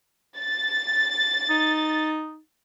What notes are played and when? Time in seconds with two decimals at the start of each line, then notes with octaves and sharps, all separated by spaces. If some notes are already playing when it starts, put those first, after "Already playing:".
0.39 A6
1.50 D#4